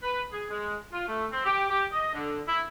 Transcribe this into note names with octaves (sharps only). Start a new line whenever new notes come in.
B4
G#4
G#3
F4
A3
C4
G4
G4
D#5
D3
E4